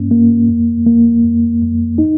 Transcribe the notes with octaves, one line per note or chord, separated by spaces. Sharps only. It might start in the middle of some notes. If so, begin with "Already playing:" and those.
Already playing: G2 A#3 C#4
A#3
F2
A#3
F2
F2
D#4